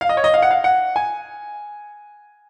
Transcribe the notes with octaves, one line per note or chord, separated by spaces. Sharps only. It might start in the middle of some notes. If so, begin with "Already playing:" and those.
F5
D#5
C#5
D#5
F5
F#5
F5
F#5
G#5